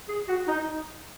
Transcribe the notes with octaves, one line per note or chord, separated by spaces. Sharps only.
G#4
F#4
D#4